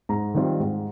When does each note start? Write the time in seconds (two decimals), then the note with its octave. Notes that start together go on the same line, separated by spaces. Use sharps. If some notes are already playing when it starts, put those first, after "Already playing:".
0.09 G#2 A#5
0.34 D#3 G3 C4 F4
0.60 G#2